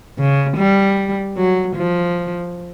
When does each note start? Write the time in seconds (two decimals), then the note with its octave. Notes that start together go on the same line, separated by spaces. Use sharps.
0.19 C#3
0.57 G3
1.37 F#3
1.76 F3